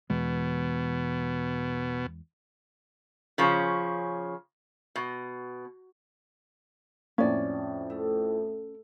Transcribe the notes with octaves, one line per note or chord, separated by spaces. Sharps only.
E2 B2 E3 G#3
C#3 F3 C#4
B2
F2 A2 A#3 C#4 D5
A3